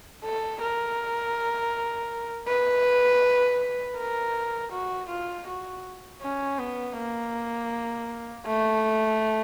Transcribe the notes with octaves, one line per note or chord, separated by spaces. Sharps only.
A4
A#4
B4
A#4
F#4
F4
F#4
C#4
B3
A#3
A3